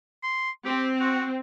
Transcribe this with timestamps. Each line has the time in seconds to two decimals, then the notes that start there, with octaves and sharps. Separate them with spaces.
0.23 C6
0.65 C4 G4
1.00 F#4